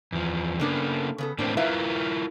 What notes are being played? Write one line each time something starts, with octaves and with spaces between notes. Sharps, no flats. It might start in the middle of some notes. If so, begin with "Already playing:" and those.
E2 F3
C#3 A#3 B3 D4 A4
C#3 B3 A4
A2 A#3 C4 D4
E4 F4 A#4 B4 E5 F5